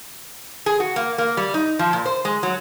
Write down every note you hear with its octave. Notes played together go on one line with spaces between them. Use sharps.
G#4
F#4
A#3
A#3
G3
D#4
F3
A#2
C5
G#3
F#3